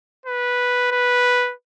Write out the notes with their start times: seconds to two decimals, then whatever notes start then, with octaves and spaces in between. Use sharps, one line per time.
0.26 B4
0.91 B4